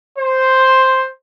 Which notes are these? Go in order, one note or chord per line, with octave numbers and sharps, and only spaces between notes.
C5